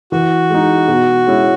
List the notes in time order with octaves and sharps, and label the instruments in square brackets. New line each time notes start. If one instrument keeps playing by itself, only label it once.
[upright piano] E3 [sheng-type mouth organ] F#4
[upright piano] G#3 D#4
B2
G#3 C#4 E4